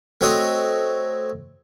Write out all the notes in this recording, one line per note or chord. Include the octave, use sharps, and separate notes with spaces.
A3 C4 F#4 C#5 D#5